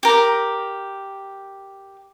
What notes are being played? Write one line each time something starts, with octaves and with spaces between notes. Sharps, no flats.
G4 A#4